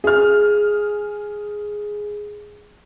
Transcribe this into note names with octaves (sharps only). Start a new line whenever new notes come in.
G#4 F6